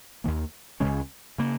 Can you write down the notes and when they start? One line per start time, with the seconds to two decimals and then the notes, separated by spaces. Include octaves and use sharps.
0.24 D#2 D#3 A#3
0.80 C#2 C#3 G#3 C#4
1.38 C#3 A#3